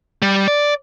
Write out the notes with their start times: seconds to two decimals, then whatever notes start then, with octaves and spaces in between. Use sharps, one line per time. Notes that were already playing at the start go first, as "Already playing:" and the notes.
0.22 G3
0.48 D5